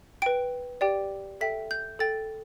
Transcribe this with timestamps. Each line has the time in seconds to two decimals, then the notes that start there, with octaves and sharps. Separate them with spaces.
0.22 B4 G5 D7
0.81 G4 D5 G5
1.41 A4 E5 G5 B6
1.71 G6
1.99 A4 G5 A6